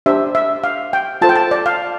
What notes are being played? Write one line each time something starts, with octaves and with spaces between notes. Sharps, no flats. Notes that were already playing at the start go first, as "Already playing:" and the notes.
D4 G4 C5 E5
E5
F5
G5
F4 A4 C5 A5
G5
A5
D5
F5